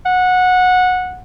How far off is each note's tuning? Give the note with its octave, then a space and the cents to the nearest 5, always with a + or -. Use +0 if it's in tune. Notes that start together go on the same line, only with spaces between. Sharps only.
F#5 -15